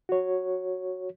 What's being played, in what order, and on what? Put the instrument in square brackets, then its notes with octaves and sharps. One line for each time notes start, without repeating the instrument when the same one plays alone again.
[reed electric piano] F#4 C#5